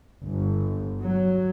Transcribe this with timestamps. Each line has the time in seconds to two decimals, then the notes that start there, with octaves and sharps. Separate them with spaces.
0.23 G1
1.03 F#3